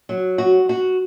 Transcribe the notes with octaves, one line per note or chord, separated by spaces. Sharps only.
F#3
F#4
F#4